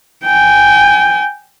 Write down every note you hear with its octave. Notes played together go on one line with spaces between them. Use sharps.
G5 G#5